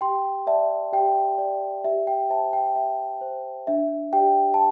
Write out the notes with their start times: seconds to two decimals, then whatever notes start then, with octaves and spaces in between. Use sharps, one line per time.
0.01 G4 G5 C6
0.47 D5 E5 A5
0.93 G4 G5
1.38 D5
1.84 G4 E5
2.07 G5
2.30 C5 E5 A5
2.53 G5
2.76 G4 E5
3.21 C5
3.67 D4 E5
4.13 G4 D5 G5
4.54 A5